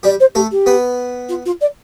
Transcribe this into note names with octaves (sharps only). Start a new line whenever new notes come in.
G3 G4 D5
C5
A3 G4 A4
G4
B3 B4
F4
F4
D5